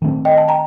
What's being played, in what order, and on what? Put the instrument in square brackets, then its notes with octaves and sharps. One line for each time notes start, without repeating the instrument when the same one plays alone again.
[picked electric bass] D#3 A3 C4
[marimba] D#5 G5
A5
G5 A#5